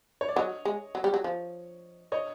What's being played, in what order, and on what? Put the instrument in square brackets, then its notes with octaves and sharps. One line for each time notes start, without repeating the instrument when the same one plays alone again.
[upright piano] C#5
D5
[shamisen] F#3 [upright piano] C#5 D#5
[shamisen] G#3
F#3
G3
F#3
F3
[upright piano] C#5 D#5